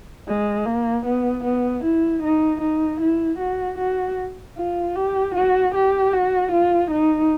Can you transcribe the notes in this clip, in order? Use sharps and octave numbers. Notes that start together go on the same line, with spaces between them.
G#3
A#3
B3
B3
E4
D#4
D#4
E4
F#4
F#4
F4
G4
F#4
G4
F#4
F4
D#4